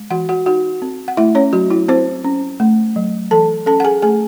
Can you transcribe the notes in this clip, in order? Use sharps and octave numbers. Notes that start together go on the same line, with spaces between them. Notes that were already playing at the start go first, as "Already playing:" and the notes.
Already playing: G#3
E3 F#4 F#5
F#4 F#5
D#4 F#4 F#5
C4
F#5
A3 E4 E5
C#4 C#5
F#3 F#4
E4
C4 E4 C5
C#4
A3
F#3
E3 A4 A5
C#4 A4 A5
F#5
G#4 G#5
A3 G#4 G#5